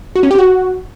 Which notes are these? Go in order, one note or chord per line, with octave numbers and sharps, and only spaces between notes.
F#4
C#4
G4
F#4